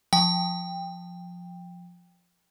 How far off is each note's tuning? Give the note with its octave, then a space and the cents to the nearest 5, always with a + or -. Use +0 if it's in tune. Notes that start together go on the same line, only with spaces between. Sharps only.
F3 +15 G5 +15